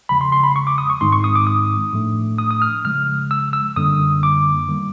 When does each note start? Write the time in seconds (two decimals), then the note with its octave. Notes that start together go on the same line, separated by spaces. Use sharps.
0.09 E2 C#3 F3 G#3 B5
0.21 C6
0.32 C6
0.44 B5
0.56 C#6
0.67 D6
0.78 D#6
0.90 C#6
1.01 G#2 D#3 G#3 C4 D#4 C6
1.12 C#6
1.24 D#6
1.35 D6
1.47 D#6
1.93 A2 F3 A3 D4
2.39 D#6
2.51 D#6
2.62 F6
2.85 C#3 F3 G#3 F6
3.31 E6
3.53 E6
3.76 F#2 D3 G3 A#3 D4 D#6
4.23 D6
4.69 D#3 G3 A#3